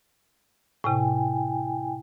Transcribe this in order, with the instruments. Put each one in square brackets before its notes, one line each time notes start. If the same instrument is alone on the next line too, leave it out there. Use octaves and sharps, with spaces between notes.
[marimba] A2 C3 [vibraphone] E4 G5 G#5